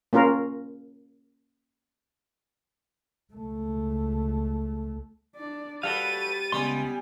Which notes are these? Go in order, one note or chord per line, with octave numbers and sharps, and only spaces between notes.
A#3 C#4 F4 A#4
C#2 A3
D4 D5
G3 F#4 A4 B4 F5 A6 D#7
C#2 G3 B3 G#5 C6